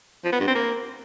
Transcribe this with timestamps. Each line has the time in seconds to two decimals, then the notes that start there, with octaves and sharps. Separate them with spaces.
0.25 F3
0.32 B3
0.40 G2
0.47 C4
0.55 A#3